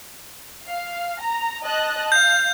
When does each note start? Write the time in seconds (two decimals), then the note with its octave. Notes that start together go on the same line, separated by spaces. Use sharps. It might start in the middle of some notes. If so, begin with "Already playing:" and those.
0.66 F5
1.21 A#5
1.64 D#5 A5 F#6
2.12 F5 G6